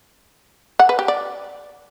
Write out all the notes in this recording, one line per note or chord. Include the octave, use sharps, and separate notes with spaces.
F#5
B4
G4
D5